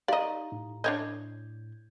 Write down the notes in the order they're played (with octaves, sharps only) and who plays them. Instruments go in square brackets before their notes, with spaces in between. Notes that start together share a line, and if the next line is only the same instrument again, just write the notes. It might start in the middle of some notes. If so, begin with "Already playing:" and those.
[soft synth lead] D#4 [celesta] G4 A#5 [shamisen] D5 D#5 [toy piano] F5
[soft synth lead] A2
[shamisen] D4 C#5 D#5 [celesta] G6 G#6